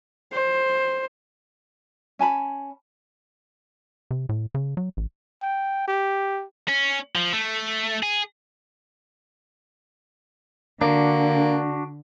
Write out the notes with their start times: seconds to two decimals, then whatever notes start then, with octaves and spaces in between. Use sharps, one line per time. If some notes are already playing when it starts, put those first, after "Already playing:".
0.32 C5
2.19 C#4 G#5 A5 B5
4.11 C3
4.29 A2
4.55 C#3
4.77 F#3
4.97 A1
5.42 G5
5.88 G4
6.69 C#4
7.15 F3
7.33 A3
8.03 G#4
10.81 D3 A#3 D4 F#4